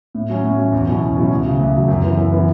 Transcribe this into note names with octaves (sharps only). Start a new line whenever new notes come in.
A2
F#3 C#4
A2
F#3 C#4
E2
B2 F#3 C#4 E4
E2
B2 F#3 C#4 E4
D2
C#3 F#3
D2
C#3 F#3
F#2
E3 B3 E4
F#2
E3 B3 E4